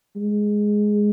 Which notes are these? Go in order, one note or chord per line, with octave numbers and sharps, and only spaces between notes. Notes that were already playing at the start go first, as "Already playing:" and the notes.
G#3